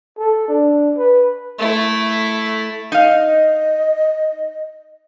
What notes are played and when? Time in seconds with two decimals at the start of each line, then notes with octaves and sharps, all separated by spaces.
0.18 A4
0.48 D4
0.98 B4
1.59 A3 E4
2.92 D#4 D#5 F5